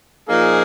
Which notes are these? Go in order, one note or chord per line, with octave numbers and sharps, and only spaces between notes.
A#2 F3 A#3 D#4 G#4